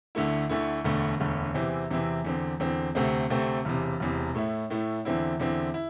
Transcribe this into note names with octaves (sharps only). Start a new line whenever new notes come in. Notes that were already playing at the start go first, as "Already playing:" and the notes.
D2 D3 A3 E4
D2 D3 A3 E4
E1 D2 D3 A3
E1 D2 D3 A3
E2 C3 E3 C4 E4
E2 C3 E3 C4 E4
E2 D3 C4
E2 D3 C4
D2 C3 A3 C4
D2 C3 A3 C4
E1 E2 C3
E1 E2 C3
A2 A3 E4
A2 A3 E4
E2 D3 C4 E4
E2 D3 C4 E4
E4